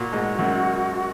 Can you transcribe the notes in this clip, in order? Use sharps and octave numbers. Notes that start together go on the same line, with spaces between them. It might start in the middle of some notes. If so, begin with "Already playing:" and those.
Already playing: A#2 F#4
G#2
F#2